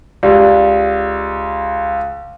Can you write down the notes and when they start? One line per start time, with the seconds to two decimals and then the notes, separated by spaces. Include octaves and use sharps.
0.23 C#2 G4 D5